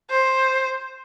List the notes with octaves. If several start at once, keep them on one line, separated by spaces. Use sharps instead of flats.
C5